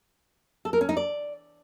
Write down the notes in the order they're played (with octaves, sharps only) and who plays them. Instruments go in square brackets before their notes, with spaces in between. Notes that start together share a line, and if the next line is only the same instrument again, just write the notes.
[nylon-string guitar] A4
A#4
C#4
D#4
D5